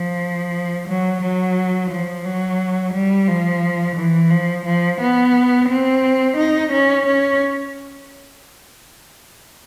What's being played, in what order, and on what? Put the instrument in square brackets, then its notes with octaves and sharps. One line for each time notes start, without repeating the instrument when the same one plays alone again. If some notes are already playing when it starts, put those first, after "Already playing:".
Already playing: [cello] F3
F#3
F#3
F3
F#3
G3
F3
E3
F3
F3
B3
C4
D#4
C#4
C#4